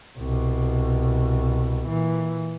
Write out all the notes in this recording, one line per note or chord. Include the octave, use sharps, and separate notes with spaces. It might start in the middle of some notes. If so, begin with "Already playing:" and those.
C2 B2
A#2 E3